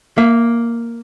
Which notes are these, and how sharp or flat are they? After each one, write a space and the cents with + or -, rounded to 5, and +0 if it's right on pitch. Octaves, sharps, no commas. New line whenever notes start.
A#3 +0 E5 +25